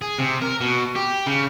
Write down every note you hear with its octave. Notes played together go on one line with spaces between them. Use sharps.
G#4
C3
A#4
B2
G4
C#3